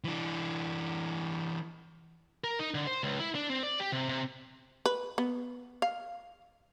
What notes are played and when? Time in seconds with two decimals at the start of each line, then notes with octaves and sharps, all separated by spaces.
0.04 E3 D4
2.44 A#4
2.59 D#4
2.74 D3
2.87 C5
3.03 C#2
3.20 E4
3.35 D4
3.50 C4
3.63 D5
3.80 G4
3.92 C3
4.09 C3
4.86 B4
5.18 B3
5.82 F5